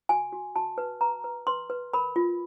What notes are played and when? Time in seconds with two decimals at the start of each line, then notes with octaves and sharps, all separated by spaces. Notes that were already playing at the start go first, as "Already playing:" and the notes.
0.09 F#4 G#5
0.33 F#4
0.56 F#4 A5
0.78 B4
1.01 B4 A#5
1.24 B4
1.47 B4 C6
1.70 B4
1.93 A#4 B5
2.16 F4